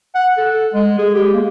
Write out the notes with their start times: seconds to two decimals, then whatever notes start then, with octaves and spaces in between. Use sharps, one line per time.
0.15 F#5
0.38 A4
0.74 G#3
0.99 G#4
1.14 G4
1.34 A#3